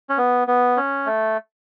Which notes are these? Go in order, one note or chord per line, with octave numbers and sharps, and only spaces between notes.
C#4
B3
B3
C#4
A3